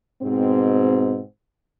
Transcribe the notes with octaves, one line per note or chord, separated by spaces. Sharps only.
G#2 B2 C4